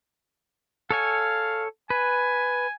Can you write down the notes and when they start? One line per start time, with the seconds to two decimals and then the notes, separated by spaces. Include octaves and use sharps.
0.91 A4 C#5 F5 G#5
1.90 B4 G#5